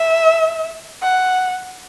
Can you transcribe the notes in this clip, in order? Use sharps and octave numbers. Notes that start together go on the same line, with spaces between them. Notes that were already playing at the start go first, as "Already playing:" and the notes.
Already playing: E5
F#5